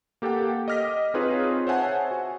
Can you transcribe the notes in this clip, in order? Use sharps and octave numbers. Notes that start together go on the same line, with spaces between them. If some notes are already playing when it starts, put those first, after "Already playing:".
A#3 G4 A4 F#5 G5
D#5 D6 F6 A#6 B6
C4 D#4 F4 G#4 B4 C#5
C5 C#5 E5 F#5 G#5 A5
F#4